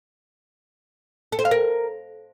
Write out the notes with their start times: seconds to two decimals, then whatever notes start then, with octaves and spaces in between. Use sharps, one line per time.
1.32 A4
1.39 C5
1.45 F5
1.51 A#4